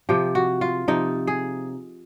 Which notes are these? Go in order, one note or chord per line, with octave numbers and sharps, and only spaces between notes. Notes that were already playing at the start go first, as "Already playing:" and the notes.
C3 F3 G4
F#4
F4
C3 F3 D#4
G#4